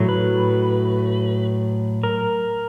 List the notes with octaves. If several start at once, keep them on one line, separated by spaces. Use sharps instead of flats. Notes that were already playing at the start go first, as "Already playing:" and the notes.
Already playing: A2 F#3 A3
B4
A#4